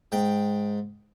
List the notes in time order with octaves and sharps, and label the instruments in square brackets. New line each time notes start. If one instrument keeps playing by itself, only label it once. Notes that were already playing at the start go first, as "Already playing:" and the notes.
[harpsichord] G#2 G5